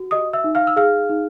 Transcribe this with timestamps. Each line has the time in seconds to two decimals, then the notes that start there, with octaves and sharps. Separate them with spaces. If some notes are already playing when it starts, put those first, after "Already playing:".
Already playing: F#4
0.11 G4 D#5 D#6
0.33 E5 E6
0.44 D#4
0.55 F5 F6
0.67 E6
0.76 G#4 F5 F6
1.09 D#4